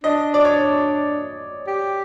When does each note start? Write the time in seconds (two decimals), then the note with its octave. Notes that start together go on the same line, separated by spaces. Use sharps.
0.04 D4 D#5
0.34 D5
0.45 C#5
1.67 G4